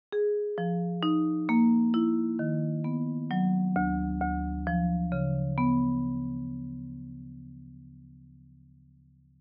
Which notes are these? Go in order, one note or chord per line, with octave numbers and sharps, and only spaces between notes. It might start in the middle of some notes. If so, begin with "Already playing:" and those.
G#4
F3
D#4
A#3
E4
D#3
B3
F#3
D2
D2
F3
C#3
B3